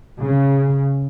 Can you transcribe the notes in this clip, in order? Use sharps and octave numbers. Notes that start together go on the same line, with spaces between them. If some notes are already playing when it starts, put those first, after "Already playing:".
C#3